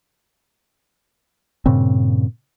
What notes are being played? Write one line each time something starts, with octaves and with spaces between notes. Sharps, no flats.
G2 A#2 C#3 C4